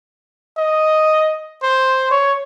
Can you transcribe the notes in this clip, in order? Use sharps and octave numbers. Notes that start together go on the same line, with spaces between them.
D#5
C5
C#5